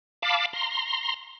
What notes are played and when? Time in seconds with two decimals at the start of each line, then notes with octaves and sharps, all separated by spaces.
0.22 F5 A5 B5 D6
0.53 A#5 C6